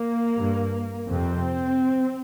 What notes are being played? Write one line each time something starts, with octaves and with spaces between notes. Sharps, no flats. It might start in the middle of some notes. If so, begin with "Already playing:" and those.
Already playing: A#3
G2
F2 C3 C4